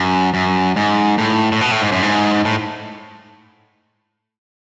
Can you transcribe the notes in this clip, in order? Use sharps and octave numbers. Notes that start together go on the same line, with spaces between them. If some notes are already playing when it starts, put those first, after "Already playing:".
Already playing: F#2
F#2
G#2
A2
A2
B2
A2
G#2
F#2
G#2
A2